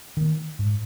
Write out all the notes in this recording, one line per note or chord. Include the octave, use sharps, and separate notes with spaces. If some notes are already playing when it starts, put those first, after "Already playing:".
D#3 A#3
G#2